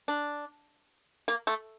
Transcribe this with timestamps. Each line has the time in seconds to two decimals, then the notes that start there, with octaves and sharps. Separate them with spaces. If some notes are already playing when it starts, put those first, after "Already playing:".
0.08 D4
1.28 A#3
1.47 A3